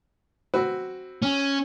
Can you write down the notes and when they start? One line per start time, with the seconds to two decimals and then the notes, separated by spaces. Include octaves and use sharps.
0.54 C4 F#4 B4
1.22 C#4